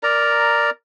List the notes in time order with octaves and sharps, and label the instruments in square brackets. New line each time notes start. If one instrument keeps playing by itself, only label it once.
[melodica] A#4 D5 A#5